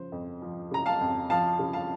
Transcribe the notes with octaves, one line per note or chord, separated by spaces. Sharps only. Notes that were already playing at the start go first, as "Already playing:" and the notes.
Already playing: C#3 F3 C5
F2
F3
C#3 A#5
F5 A5
F2
F3 F5 A5
C#3
F5 A5